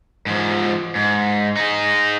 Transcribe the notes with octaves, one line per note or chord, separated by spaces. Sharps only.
G#2 F3
G#2
D#4 G#4